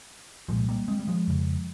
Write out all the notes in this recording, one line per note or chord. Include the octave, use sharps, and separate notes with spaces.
C2 A#2 F3 G#3
G3 A#3
G#3 C4
G3
F3 G#3
F2 C#3